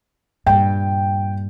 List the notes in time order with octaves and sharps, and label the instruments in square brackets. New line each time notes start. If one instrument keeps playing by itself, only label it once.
[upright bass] G2 A#2 [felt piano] G5